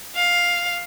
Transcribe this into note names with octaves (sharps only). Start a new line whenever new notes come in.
F5